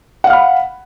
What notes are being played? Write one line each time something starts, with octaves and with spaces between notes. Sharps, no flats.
F5 F#5 B5 F6